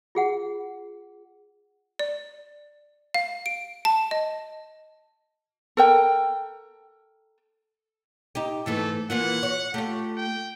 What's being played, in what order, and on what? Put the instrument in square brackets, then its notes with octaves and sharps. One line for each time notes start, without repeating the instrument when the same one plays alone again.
[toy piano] F4 G#4 F#5
[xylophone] D5
F5
D7
A5
D#5
[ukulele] A4 A#4 G5
[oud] D#4 G4
[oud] G#2 E3 A3 [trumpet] A4
[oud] E3 A#3 F4 [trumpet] F#5
[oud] F#4 C#5
[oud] A3 F4 [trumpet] G4
[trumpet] G5